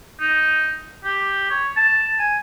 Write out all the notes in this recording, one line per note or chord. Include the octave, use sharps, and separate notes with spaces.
D#4
G4
C#5
A5
G#5